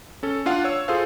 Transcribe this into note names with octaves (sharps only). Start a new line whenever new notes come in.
C#4 A4
D4 F4 F5 F#5
C#5 E6
F4 G#4 A4 C5 F5